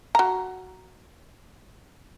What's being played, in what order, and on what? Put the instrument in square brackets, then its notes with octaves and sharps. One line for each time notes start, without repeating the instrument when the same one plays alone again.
[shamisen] F#4 A#5